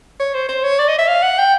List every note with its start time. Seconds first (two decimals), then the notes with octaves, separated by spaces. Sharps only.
0.20 C#5
0.34 C5
0.49 C5
0.63 C#5
0.79 D5
0.88 D#5
0.98 E5
1.08 F5
1.22 F#5
1.38 G5